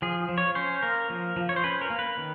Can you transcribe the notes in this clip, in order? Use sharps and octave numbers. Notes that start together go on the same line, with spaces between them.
F3 G#4
F3
C#5
C#4 C5
A#3 A#4
F3
F3
C#5
C5
C#4 B4
A#4
A#3
B4
D#3